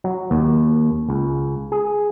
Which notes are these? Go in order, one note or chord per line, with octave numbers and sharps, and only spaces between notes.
F#3
D#2
C#2
G#4